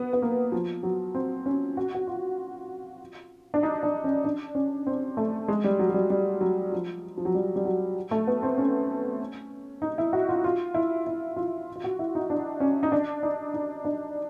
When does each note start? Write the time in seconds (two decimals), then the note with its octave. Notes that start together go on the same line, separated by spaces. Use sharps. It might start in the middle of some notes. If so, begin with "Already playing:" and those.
Already playing: B3
0.13 B3
0.22 A#3
0.52 F3
0.83 F#3
1.15 C4
1.46 C#4
1.77 F#4
1.94 F#4
2.07 F4
3.54 D4
3.63 D#4
3.83 D4
4.04 C#4
4.24 D4
4.55 C#4
4.87 C4
5.17 A3
5.48 G#3
5.64 G3
5.79 F#3
5.90 F#3
5.94 G3
6.10 G3
6.41 F#3
6.72 F3
7.18 F3
7.25 F#3
7.35 G3
7.56 G3
7.65 F#3
8.11 A3
8.27 B3
8.43 C4
8.58 C#4
9.82 D#4
9.98 E4
10.13 F#4
10.29 F4
10.44 F4
10.74 E4
11.07 E4
11.37 F4
11.76 F4
11.84 F#4
11.99 E4
12.15 D#4
12.30 D4
12.60 C#4
12.83 D#4
12.92 D4
13.23 D#4
13.54 D#4
13.85 D4